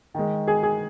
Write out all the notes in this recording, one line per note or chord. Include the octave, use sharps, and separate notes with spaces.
D#3 G#3
G#4
G#4